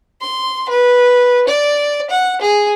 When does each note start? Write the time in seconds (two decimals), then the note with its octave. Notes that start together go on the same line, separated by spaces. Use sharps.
0.21 C6
0.69 B4
1.48 D5
2.10 F#5
2.41 G#4